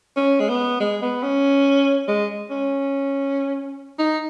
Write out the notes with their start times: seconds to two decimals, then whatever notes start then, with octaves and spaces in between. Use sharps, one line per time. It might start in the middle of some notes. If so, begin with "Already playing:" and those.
0.17 C#4
0.40 G#3
0.49 B3
0.80 G#3
1.02 B3
1.23 C#4
2.08 G#3
2.50 C#4
3.99 D#4